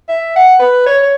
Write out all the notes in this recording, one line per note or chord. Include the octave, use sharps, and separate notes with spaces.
E5
F#5
B4
C#5
C#5